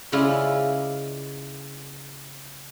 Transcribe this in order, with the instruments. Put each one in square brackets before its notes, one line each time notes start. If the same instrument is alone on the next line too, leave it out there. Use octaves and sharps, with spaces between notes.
[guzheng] C#3 G#3 E4 F4 D5